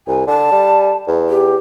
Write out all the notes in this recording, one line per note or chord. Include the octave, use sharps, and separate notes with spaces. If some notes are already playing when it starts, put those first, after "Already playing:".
C2 G#5
D3 A5
G3
E2
G4